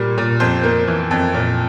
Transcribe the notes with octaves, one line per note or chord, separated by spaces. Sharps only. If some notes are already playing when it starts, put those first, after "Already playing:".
Already playing: A#2 G3 A#3
A#2
F2 C5
A#3
E3
F2
A#2